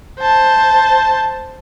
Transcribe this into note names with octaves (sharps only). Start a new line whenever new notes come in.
C5 A5